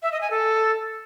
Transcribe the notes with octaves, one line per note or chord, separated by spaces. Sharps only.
E5
D#5
G#5
A4